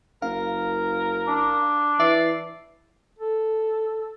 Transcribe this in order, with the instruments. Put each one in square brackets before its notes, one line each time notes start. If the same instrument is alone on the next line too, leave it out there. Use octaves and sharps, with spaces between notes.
[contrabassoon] F#1 [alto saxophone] A#4 [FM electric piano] F5
[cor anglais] D4
[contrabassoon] E3 [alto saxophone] D5 [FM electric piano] E5 C7
[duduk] A4